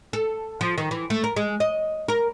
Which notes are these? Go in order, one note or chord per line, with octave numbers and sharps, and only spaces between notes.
A4
F3
D#3
E3
A3
A#4
G#3
D#5
A#4